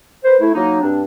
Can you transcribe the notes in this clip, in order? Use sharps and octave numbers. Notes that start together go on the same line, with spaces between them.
B4 C5
A3 E4
F#3 A#3 D#4
G2 C4 D4